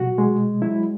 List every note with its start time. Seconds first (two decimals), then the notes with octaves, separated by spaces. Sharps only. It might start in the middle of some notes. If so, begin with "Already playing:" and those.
Already playing: B2 F#3 F#4
0.18 G#3
0.62 F#3 E4